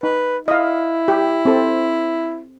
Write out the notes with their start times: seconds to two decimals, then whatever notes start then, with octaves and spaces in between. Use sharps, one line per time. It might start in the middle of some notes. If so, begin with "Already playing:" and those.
0.03 D#4 B4
0.48 E4 D#5 F5
1.08 G4
1.45 C4 A4